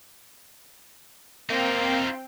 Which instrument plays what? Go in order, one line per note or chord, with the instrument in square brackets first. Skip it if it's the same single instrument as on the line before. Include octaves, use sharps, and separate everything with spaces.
[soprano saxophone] A#3 [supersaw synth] C4 G5 [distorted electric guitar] D#4 F4